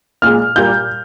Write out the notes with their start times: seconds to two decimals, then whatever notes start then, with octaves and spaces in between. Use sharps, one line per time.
0.22 A#2 G#3 F6
0.56 A#2 G3 A#3 G6